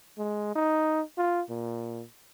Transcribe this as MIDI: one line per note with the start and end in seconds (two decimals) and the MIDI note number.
0.18 0.55 56
0.56 1.01 63
1.18 1.42 65
1.49 2.03 46